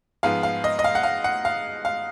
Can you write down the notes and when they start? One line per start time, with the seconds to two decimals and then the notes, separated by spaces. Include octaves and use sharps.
0.23 G#2 F3 G#3 B3 F5
0.43 F5
0.64 D#5
0.79 D#5
0.84 F5
0.95 F#5
1.03 F5
1.24 F#5
1.45 F5
1.85 F5